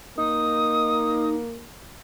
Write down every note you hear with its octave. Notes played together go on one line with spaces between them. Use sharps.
A#3 D#4 D#6